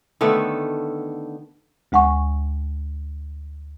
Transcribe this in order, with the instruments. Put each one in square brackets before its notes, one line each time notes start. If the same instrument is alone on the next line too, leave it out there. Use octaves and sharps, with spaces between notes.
[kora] D3 D#3 A3 B3
[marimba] D2 G#3 F#5 G#5 C#6